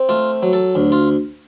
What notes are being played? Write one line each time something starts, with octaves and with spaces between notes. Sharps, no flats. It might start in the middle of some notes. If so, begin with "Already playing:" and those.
Already playing: C4
A3 F4
F#3
A4
D2
F4